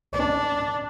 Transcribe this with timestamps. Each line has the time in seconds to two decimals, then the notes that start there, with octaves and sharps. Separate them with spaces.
0.13 D4